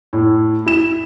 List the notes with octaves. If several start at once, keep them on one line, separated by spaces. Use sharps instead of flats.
A2
E4 E7